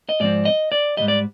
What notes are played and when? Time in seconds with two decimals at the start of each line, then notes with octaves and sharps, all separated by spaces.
0.09 D#5
0.20 G#2 F3 C4 D5
0.45 D#5
0.72 D5
0.97 G#2 D#3 G3 D#5
1.08 D5